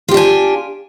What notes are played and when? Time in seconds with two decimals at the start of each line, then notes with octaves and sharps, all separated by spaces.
0.09 F4
0.11 G4
0.14 D4
0.17 G#5